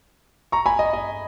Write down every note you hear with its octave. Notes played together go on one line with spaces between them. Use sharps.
A#5 C#6
G#5 B5
D#5
D#5